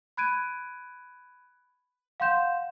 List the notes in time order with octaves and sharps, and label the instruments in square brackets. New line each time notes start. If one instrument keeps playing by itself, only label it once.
[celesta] B5 F#6 G#6 D7 D#7
F5 F#5 C6 G6 E7